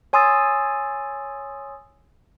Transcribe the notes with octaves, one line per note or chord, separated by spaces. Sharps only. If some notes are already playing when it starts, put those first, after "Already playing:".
C#5 G#5 C6 D#6 E6 A6